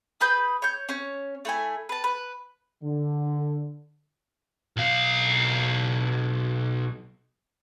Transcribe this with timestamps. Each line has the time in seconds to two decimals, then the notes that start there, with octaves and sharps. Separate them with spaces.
0.21 G#4 B4 B5 G6
0.62 C#5 G6
0.89 C#4 C#5
1.45 A3 E4 G#5
1.89 B4 A5
2.04 B4
2.84 D3
4.77 B1 F5